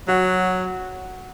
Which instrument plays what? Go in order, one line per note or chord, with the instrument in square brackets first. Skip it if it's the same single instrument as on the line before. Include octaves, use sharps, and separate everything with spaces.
[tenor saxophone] F#3 [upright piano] F#4